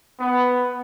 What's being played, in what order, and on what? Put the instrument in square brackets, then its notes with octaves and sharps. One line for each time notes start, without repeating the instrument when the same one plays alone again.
[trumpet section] B3